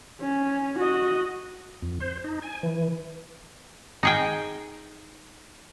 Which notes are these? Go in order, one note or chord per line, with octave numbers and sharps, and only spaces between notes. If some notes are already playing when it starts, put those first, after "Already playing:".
C#4
F#4 D#5
F2
C5
D#4
G#5
E3
D#4 G#4 G5